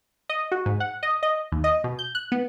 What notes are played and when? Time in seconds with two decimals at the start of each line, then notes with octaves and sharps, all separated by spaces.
0.29 D#5
0.52 F#4
0.66 G#2
0.80 F#5
1.03 D#5
1.23 D#5
1.52 D#2
1.64 D#5
1.84 B2
1.99 G6
2.15 F#6
2.32 B3